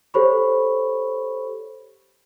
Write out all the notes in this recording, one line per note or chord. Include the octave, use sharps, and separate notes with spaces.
G4 A4 C5 C#5 B5 C#6